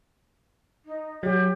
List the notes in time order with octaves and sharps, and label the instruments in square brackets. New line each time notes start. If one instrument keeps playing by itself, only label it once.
[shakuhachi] D#4
[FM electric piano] F#3 [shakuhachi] G4